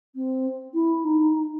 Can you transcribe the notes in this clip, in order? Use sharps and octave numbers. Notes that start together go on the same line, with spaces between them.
C4
E4
D#4